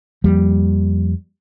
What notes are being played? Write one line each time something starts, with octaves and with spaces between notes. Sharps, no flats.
F2 F3 G3 A#3